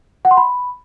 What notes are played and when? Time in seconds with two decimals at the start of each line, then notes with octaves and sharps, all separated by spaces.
0.25 F#5
0.31 C6
0.37 B5